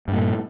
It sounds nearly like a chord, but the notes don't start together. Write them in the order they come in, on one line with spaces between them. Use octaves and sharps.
G2 A#3 A#2